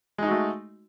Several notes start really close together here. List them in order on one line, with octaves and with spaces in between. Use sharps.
G#3 D#4 F#4 A3